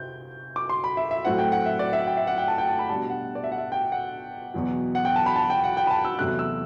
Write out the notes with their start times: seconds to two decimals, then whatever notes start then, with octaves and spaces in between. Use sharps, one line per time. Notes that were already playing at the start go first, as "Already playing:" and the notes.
Already playing: C3 C4 E4 G6
0.56 D6
0.69 C6
0.84 B5
0.97 E5
1.11 E5
1.24 A2 F#3 A3 C4 E4 F#5
1.38 G5
1.52 F#5
1.66 E5
1.79 D5
1.93 E5
2.07 G5
2.17 E5
2.27 F#5
2.38 G5
2.48 A5
2.58 G5
2.68 A5
2.79 B5
2.89 B2 G3 D4 A5
3.10 F#5
3.35 D5
3.44 E5
3.52 F#5
3.58 E5
3.72 G5
3.92 F#5
4.54 E2 B2 F#3
4.95 F#5
5.05 G5
5.16 A5
5.26 B5
5.36 A5
5.50 G5
5.64 F#5
5.77 G5
5.87 B5
5.91 A5
6.05 E6
6.18 E2 C3 F#3 A3 F#6
6.39 E6